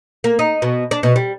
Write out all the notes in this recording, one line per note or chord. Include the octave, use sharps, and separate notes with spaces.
A#3
D#4
B2
D4
B2
G3